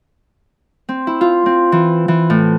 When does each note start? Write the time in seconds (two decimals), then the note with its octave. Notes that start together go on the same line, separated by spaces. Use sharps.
0.89 C4
1.07 E4
1.21 F4
1.46 C4
1.72 E3
2.08 E3
2.30 A2